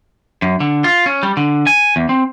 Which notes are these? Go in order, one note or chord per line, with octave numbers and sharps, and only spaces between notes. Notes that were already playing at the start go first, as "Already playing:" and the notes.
F#2
D3
F4
C#4
G3
D3
G#5
E2
C4